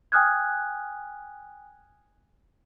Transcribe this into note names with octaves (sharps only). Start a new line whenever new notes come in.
G5 G#5 D#6 F6 F#6 G#6